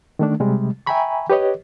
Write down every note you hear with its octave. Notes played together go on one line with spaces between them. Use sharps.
D#3 A3 D4
C3 G3 G#3
E5 G5 G#5 A#5 B5 C#6
G4 B4 C#5 D#5